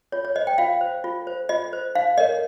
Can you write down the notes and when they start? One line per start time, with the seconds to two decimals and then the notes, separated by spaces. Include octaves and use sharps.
0.12 F4 C#5
0.25 C#5
0.36 C5 D#5
0.47 G5
0.58 F4 F5
0.81 C5
1.04 F4
1.27 C5
1.49 F4 D#5
1.73 C5
1.95 D#4 F5
2.18 A#4 C#5 D#5